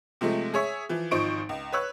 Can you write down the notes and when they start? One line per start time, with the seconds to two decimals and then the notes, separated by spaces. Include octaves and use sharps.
0.21 C3 F3 G#3 A3
0.54 G#4 C#5 E5
0.89 E3 F3
1.11 G#1 F3 D#4 C5 C#6 D7
1.49 C#2
1.72 B4 C#5 E6 F#6